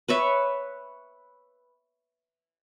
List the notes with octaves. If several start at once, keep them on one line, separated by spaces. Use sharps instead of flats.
B4 C#5 E5